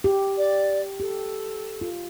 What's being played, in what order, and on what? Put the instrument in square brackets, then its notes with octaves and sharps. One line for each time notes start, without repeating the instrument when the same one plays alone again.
[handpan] G4
[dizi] D5
[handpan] G4 [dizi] A4
[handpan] F4